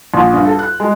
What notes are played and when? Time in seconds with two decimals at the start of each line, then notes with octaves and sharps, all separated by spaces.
0.14 A#1
0.33 G2
0.45 A4
0.59 F#6
0.80 G#3